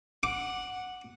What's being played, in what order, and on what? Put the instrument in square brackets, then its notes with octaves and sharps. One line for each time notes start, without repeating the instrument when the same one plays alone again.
[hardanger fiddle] F#5 [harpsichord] D6